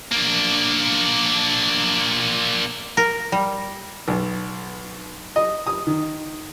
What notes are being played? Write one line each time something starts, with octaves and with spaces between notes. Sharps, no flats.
A#3 D4
A#4
G3
B1
D#5
D#6
D#3